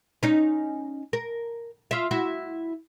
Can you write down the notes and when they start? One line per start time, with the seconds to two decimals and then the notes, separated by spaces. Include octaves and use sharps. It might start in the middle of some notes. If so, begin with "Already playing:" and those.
0.23 C#4 D#4
1.13 A#4
1.91 F4 E5
2.11 E4 F#4